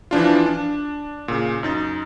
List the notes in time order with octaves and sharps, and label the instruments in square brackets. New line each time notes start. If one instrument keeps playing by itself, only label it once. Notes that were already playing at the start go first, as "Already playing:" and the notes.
[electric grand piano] E3 F3 D4 F4
D4
A#2 C#3
F#2 D#4 A6